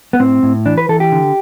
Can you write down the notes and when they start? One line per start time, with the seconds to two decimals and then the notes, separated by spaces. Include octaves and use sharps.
0.13 B3
0.19 A2 C4
0.43 A2
0.66 E3 D4
0.78 B4
0.89 E3 A4
1.00 G4
1.12 D3